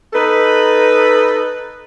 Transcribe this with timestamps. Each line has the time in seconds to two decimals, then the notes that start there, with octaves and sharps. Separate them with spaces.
0.13 D#4 A4 B4